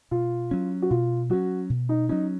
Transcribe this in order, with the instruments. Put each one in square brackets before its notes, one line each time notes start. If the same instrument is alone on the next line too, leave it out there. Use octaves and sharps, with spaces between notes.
[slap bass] B2 [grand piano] F4
[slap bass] F#3 C#4
[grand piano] F#4
[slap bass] B2 [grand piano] F4
[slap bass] F#3 C#4 [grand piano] F#4
[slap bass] B2
[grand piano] D#4
[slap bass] F#3 C#4 [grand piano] D#4